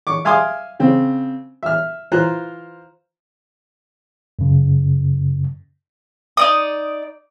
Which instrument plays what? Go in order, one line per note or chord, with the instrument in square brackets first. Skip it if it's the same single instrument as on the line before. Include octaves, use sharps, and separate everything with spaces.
[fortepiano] C#6 D6
E5 F5 G#5 C6 D6 D#6
C#3 C4
E5 F6
E3 F4 C5 A#5 F#6
[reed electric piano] F#2 C#3
[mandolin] D#4 D5 D#6